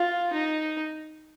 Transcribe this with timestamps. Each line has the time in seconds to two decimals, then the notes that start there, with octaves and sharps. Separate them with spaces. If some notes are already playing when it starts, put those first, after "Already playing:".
Already playing: F4
0.33 D#4